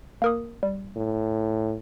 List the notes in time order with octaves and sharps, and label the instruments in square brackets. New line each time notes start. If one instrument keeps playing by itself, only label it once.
[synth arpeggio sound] A#3 A#4 D#6
G3
[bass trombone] A2